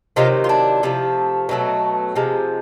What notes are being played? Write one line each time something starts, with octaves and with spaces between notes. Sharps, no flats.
C3 D#3 F#3 D#4 F4
F4
D4 E4
C3 F3 A3
B2 F#3 A3
C3 F3 G#3